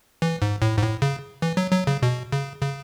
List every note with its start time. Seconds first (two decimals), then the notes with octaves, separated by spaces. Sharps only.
0.22 E3
0.42 G#2
0.62 A2
0.78 G#2
0.82 A2
1.02 C#3
1.42 E3
1.57 F#3
1.73 F#3
1.87 C#3
2.03 B2
2.32 C#3
2.62 C#3